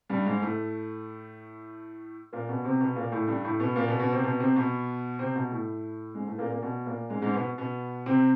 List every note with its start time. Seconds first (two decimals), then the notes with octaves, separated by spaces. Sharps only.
0.10 G2 G3
0.26 G#2 G#3
0.41 A2 A3
2.33 A#2 A#3
2.49 B2 B3
2.65 C3 C4
2.80 B2 B3
2.96 A#2 A#3
3.12 A2 A3
3.28 G2 G3
3.44 A2 A3
3.60 B2 B3
3.76 A#2 A#3
3.88 B2 B3
3.99 B2 B3
4.12 C3 C4
4.23 B2 B3
4.39 C3 C4
4.56 B2 B3
5.19 C3 C4
5.35 B2 B3
5.51 A2 A3
6.15 G#2 G#3
6.27 A2 A3
6.38 A#2 A#3
6.50 A#2 A#3
6.62 B2 B3
6.86 A#2 A#3
7.10 G#2 G#3
7.22 G#2 G#3
7.34 B2 B3
7.58 B2 B3
8.06 C3 C4